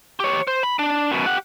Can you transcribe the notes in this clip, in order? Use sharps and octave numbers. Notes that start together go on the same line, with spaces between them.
G4 C#5
C5
B5
D4
F#2 B2
G4 F#5